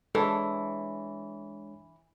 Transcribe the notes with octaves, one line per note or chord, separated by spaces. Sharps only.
E3 G#3 D4 A4 C#5